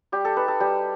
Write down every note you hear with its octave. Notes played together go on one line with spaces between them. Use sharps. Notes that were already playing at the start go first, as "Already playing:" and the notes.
G3 G4
A4
D#4 B4
A4
G3 G4